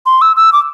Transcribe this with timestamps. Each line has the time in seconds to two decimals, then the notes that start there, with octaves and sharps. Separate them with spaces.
0.06 C6
0.22 E6
0.37 E6
0.53 D6